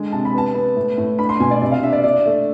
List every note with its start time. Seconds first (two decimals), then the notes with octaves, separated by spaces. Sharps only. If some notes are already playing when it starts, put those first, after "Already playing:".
Already playing: D3 G#3
0.12 C3 A5
0.25 B5
0.34 B3 A5
0.55 B3
0.76 A2
0.98 A2
1.18 D4 B5
1.29 C6
1.40 B2 G#5
1.51 D5
1.62 C3 D5
1.72 F5
1.83 D4 E5
1.93 D5
2.04 D4 D5
2.25 A3